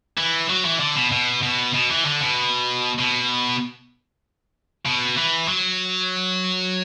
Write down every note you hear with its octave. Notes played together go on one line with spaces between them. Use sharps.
E3
F#3
E3
D3
B2
B2
B2
B2
E3
D3
B2
B2
B2
E3
F#3